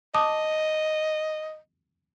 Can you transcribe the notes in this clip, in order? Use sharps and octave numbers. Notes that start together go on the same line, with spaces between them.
D#5 A5 D6 D#6